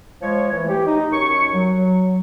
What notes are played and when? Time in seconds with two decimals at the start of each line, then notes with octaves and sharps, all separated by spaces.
0.22 F3 G#3 C#5
0.52 E3 A3
0.69 G4
0.87 D#4
1.12 F#2 C#5 C#6
1.54 F#3